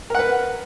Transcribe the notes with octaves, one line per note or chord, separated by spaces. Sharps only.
A#4 B4 F#5